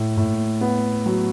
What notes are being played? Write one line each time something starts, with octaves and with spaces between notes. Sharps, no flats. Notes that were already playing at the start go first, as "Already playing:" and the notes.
Already playing: A2
A2
B3
F#3